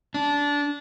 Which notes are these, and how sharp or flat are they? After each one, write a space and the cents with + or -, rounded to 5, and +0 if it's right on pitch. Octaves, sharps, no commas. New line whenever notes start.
D4 -20